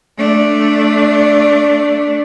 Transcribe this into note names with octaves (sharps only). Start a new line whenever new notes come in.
A3 D4